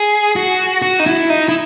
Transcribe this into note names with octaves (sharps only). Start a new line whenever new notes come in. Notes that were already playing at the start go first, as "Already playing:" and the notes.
Already playing: G#4
F#4
F#4
D#4
E4
D#4
E4